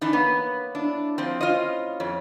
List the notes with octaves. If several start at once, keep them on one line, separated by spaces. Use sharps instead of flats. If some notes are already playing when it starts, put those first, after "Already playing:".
E3 D4 D#4
A#3 B3 C#5 F#5
D4 E4
F3 C4 C5
C#4 F4 C#5 D#5
F2 C#5